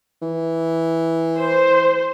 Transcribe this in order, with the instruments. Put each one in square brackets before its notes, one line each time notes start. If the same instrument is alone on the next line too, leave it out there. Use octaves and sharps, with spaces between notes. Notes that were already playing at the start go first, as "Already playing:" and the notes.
[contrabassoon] E3
[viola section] C5